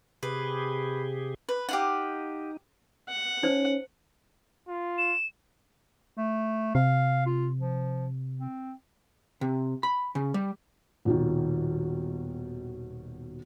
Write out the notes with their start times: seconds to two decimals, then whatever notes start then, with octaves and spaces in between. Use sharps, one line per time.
0.23 C3 G4 G#4 B4
1.49 B4
1.69 D#4 G4 F5 F#5
3.09 F#5
3.43 C#4 D#4 C5
4.69 F4
4.98 E7
6.17 A3
6.75 C3 F5
7.26 F4
7.58 F3
8.38 C4
9.41 C3
9.83 B5
10.15 C#3
10.34 G3
11.05 D#1 B2 D#3